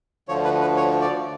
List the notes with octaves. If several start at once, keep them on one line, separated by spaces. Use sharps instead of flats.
D2 D3 F3 C#5
B4
B4
C#5
D5